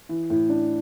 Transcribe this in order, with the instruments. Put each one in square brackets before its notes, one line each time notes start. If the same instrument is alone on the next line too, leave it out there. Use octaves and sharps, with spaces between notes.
[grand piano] E3
A2
D4